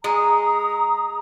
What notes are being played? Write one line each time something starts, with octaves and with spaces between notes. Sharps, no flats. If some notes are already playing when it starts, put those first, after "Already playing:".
G#3 A#5 D#6